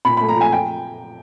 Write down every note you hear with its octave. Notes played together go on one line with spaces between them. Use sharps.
A#2 B5
A3 B5
A#5
F3 G#5
G5